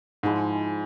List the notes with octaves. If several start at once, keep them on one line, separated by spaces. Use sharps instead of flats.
G#2 F3 G#3 E4